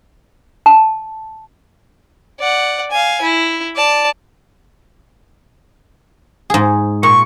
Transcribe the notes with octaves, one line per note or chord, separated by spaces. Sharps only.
A5
D5 F#5
F5 G#5
E4
D5 A5
G#2 G#4
A#2 C#6